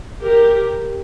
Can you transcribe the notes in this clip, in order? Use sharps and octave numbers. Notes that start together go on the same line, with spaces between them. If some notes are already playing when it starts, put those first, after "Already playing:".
G4 A#4